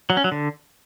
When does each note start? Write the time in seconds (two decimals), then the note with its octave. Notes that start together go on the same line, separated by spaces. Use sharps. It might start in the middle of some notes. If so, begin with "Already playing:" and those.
0.10 F#3
0.17 C#4
0.24 F#3
0.32 D3